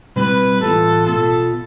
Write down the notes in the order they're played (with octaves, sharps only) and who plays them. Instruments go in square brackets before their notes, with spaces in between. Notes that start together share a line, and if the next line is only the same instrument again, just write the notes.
[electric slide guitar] B2 G3 C4 E4 G4 [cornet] B4
[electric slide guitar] A2 E3 B3 F4 [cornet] A4
[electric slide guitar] B2 B3 F4 [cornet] A4